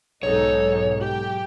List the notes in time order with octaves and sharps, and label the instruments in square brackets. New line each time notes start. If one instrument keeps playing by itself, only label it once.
[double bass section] B1 G#2 [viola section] D#4 A4 [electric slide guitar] C#5
[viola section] G4 G5